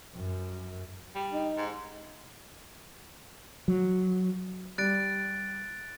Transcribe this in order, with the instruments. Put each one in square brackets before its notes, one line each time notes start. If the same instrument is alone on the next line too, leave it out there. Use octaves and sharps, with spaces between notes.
[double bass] F#2
[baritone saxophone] G3
[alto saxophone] D#4
[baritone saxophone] G#2
[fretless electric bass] F#3
[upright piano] G3 [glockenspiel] F#6 A6 D7